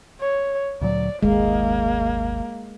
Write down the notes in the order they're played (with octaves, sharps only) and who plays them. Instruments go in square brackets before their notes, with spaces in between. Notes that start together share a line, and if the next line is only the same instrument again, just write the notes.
[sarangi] C#5
[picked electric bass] D2 A#2 F#3 [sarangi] D5
[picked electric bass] D#1 G#1 [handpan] G#3 [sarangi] A#3